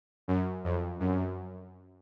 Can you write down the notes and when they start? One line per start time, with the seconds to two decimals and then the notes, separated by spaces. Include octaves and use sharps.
0.28 F#2
0.64 F2
1.00 F#2